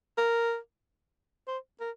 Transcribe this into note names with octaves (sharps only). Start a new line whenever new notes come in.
A#4
C5
A#4